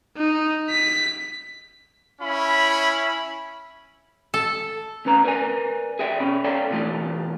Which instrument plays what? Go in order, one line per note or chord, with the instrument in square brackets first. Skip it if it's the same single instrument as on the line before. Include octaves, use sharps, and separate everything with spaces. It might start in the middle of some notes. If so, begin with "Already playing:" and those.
[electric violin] D#4
B6
[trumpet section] C#4 E4 B5
[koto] A4
[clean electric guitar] D2 C#4 B4 A#5
A#4 B4 D5 G#5
G#4 D5 E5 G5
B2 C#4 B5
A4 C#5 D5 F5 G5
B2 D3 E3 A3 F4 G4